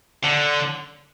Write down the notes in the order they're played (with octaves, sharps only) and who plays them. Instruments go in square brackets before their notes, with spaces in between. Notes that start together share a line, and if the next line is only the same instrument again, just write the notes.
[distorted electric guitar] D3